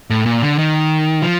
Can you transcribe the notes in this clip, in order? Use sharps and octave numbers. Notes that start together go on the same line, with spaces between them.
A2
A#2
D3
D#3
F3